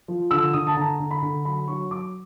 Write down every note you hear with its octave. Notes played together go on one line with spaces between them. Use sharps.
F3
D3 E6
D3 D#6
A5
D3 A#5
D3
B5
D3
F#3 B5
F#3 C#6
F#3 D6